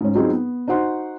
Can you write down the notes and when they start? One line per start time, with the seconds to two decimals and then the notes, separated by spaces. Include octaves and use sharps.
0.01 G#2 C#4
0.15 F#3 C4 D#4 F4 G#4
0.30 B3
0.68 D#4 F#4 C5 F#5 C6